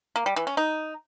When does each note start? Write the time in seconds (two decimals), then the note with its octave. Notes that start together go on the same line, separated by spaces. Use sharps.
0.16 A#3
0.26 G3
0.36 E3
0.47 C#4
0.57 D#4